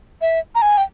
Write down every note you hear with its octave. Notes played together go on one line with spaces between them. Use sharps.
E5
A#5
G#5
G5